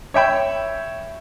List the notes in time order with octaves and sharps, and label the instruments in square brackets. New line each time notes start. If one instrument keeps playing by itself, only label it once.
[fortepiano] C#5 E5 G5 B5